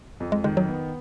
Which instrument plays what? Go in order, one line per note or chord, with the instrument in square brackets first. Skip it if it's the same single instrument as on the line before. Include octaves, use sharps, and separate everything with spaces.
[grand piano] F2
[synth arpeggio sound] G#3
[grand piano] D#3 [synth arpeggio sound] G#3
[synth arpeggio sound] F#3
[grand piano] B3